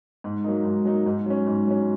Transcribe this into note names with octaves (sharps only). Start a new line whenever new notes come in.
G#2
F#3 A#3 D#4
G#2
F#3 A#3 D#4
G#2
F#3 C#4
G#2
F#3 C#4